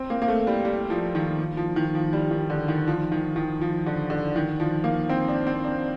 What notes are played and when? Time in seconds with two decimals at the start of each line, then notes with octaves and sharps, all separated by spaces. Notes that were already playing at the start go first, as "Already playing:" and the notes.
Already playing: C4
0.10 A#3
0.22 A#3
0.28 A3
0.47 G3
0.65 G3
0.90 F3
1.15 D#3
1.57 F3
1.76 D#3
1.95 F3
2.13 G3
2.31 D#3
2.50 D3
2.68 D#3
2.88 F3
3.12 D#3
3.36 D#3
3.61 F3
3.86 D3
4.10 D3
4.36 D#3
4.60 F3
4.84 A#3
5.09 C4
5.28 D4
5.47 C4
5.64 D4